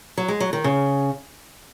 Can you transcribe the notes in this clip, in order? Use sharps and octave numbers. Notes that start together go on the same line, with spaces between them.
F#3
G#3
F#3
D#3
C#3